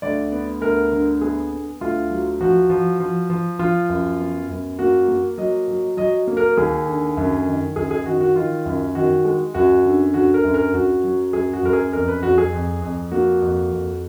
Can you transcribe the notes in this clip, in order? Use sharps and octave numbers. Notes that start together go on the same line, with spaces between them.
D2 D5
B3
D2 A#4
D3
B3 G#4
B3
D2 F4
F#3
F3 F#4
F3
F3
F3
F3 F4
F#2
B3
F#2
A#3 F#4
A#3
F#3 D#5
F#3
F#3 D#5
A#3
A#4
D#2 G#4
D3
F#2
D#3
F#2 G#4
G#4
D#3 F#4
F#4
D#3 F4
F#2
D#3 F#4
G#3
F#2 F#4
D3
D3 F#4
A#4
F#2
A#4
F#2 F#4
F#3
F#2 G#4
F#4
F#2 A#4
G#4
F2 A#4
B4
F2 F#4
G#4
F2
F2
A#3 F#4
F2
F2